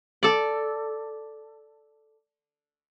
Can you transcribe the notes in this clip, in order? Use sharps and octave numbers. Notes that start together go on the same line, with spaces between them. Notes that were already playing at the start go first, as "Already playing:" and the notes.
A4 D5